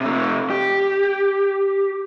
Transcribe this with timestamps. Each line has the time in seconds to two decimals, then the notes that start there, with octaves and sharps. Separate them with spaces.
0.01 C3 A3
0.50 G4